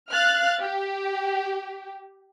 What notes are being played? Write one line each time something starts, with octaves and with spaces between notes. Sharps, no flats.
F5 F6 F#6 A6
G4